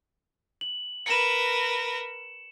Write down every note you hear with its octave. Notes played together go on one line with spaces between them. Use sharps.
F#7
A#4 B4 C#7 E7